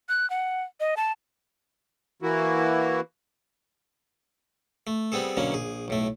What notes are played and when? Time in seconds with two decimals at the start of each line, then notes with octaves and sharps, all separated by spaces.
0.09 F#6
0.30 F#5
0.80 D#5
0.97 A5
2.22 E3 A#3 E4 F#4
4.87 A3
5.12 G3 B3 C4 G#4 A4
5.37 B2 D3 F#3 A#3 C#4
5.52 A#1 G#4
5.88 B1 A2 A3